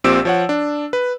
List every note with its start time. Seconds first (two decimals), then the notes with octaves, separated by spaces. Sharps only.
0.04 A#1 A#2 C4 G4 E6 D7
0.25 F3 C#5 F#5
0.49 D4
0.93 B4